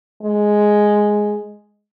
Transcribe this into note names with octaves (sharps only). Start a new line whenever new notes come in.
G#3